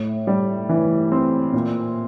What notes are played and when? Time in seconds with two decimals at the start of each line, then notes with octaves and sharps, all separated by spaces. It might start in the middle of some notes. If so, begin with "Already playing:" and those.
Already playing: A2
0.27 G3
0.69 E3
1.12 C4
1.53 A#2